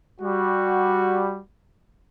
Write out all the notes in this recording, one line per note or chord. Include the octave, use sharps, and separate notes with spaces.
G3 F#4